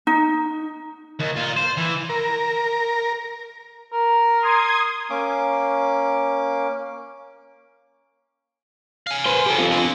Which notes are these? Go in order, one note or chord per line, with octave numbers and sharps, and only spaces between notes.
D#4
D#2
A#2 F4
C5
E3
A#4
A#4
C6 D#6 G#6
A#3 C#4 D6
F5 G#5
B4 C5
G4 A4
C4 F4
D4 C6